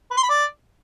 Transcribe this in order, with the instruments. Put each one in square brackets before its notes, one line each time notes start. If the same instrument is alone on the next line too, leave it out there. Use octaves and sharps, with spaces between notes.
[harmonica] B4
C6
B5
D5